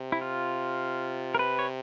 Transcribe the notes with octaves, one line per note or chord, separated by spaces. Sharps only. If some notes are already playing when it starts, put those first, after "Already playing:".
Already playing: C3
E4
F4
A#4
B4
C#5